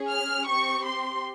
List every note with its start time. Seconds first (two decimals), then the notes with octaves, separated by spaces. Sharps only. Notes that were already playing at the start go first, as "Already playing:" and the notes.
Already playing: C#4 G#4
0.09 F6
0.46 C4 G4 C#6
0.85 C6